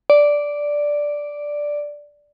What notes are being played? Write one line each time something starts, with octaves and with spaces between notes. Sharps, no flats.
D5